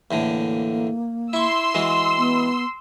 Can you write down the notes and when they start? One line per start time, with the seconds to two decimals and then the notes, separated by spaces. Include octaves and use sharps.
0.11 E2 A2 D3 A#3
1.33 E4 C6 C#6 E6
1.74 E3 G#3 F#4
2.18 B3